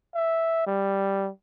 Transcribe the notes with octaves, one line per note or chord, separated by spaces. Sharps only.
E5
G3